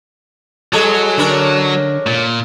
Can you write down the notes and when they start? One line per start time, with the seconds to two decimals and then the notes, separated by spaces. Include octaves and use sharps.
0.73 F#3 G3 G#4 A4
1.18 D3 C#4 D4 A#4
2.07 A#2